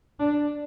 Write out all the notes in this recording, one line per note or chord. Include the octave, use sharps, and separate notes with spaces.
D4